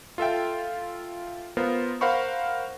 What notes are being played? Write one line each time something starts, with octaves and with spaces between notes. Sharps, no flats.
F4 A4 E5 G5
B3 F4 A#4 C5
A#4 C5 F5 F#5 B5 C#6